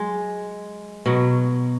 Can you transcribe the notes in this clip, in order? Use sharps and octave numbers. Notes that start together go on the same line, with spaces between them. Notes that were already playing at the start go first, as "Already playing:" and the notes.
Already playing: F#3 G#3
B2 F#3